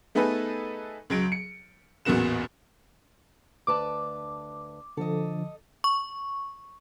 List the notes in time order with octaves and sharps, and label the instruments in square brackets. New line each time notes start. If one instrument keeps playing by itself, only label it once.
[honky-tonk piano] A3 B3 D#4 G#4 A4 B4
C#2 F#3 D7
C#7
A1 E2 A#2 B3 F#4 E7
[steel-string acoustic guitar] D2 B4 A5 [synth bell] D6
[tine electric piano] D3 F3 [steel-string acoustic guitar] A4 D#5
[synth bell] C#6